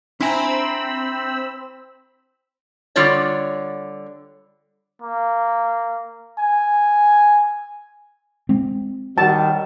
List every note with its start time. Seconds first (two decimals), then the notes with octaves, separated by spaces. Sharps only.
0.21 C4 D4 E4 G#5 A#5 B5 E6
2.96 D3 G3 F4 C#5 D5
5.02 A#3
6.39 G#5
8.49 G#3 C4
9.18 D#3 F#3 G3 A5